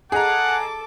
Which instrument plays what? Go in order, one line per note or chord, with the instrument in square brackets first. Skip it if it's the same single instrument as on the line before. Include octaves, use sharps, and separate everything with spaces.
[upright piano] G#4 D#5 A#5 [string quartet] A4 A5 D6 [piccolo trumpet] F#5